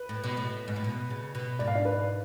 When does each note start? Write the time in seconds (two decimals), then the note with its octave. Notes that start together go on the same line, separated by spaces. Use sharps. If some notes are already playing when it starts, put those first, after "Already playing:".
Already playing: B4
0.09 A2
0.24 B2
0.37 A2
0.68 G#2
0.76 A2
0.84 B2
1.10 C#3
1.35 B2
1.59 G#2 D5
1.68 F5
1.75 D4 D5
1.85 B4